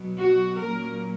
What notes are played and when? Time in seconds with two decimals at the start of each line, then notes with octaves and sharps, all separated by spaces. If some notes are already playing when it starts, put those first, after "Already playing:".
Already playing: B2 F#3 B3
0.18 F#4
0.58 A#2 F#3 A#3 C#4 A#4